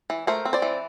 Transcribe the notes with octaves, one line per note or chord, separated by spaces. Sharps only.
E3
A3 A#4 C5
C4
C5 D5
E3